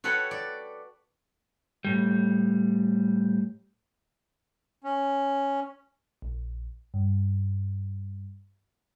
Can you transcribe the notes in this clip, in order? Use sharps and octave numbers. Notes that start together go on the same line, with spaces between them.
F#4 A4 B4 C#5 F#5 G5
D5
A2 G3
C#4
A#1
G2